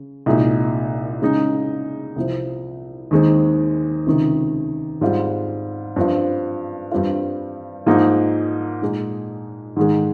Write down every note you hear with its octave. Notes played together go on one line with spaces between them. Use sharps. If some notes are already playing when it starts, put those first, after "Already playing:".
Already playing: C#3
C2 A#2 G#3 D#4
C#3 G#3 D#4
C2 C3 F3 C4
D#2 D#3 G#3 C4
C#2 C3 D#3
G#2 G3 C4 F4
G2 F3 C4 F4
G2 G3 C4 F4
G#2 F3 A#3 D#4
A#2 G#3 D#4
G#2 D#3 G#3